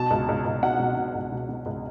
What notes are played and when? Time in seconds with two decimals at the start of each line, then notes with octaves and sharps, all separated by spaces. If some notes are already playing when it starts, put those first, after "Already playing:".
Already playing: B2 A5
0.10 C#2
0.29 C#2
0.45 C#2
0.63 B2 F#5
0.80 B2
0.97 B2
1.14 C#2
1.32 B2
1.49 B2
1.66 C#2